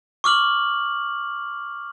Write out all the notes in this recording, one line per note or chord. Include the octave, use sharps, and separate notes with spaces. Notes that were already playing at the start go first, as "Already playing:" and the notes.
C#6 D6 F6 F#7